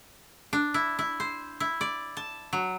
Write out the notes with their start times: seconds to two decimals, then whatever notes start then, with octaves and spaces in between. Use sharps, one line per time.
0.53 D4
0.74 E4
0.99 E4
1.20 C5
1.60 E4
1.81 D5
2.17 A5
2.53 F#3